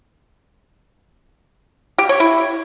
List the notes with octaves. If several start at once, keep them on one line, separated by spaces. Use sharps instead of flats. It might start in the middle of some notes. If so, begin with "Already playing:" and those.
G4
C#5
E4